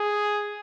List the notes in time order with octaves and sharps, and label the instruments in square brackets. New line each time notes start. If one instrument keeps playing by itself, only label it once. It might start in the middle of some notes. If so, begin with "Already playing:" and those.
Already playing: [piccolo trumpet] G#4